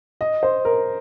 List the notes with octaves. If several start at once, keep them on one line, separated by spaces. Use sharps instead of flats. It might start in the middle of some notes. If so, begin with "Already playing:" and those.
D#5
C5
A#4